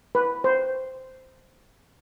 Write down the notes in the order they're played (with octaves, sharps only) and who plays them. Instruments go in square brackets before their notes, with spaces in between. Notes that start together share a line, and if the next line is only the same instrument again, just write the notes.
[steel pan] B4
C5